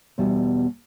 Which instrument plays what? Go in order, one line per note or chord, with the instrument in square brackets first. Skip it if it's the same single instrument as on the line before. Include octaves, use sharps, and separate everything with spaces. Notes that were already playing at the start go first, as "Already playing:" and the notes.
[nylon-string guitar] E2 B2 G3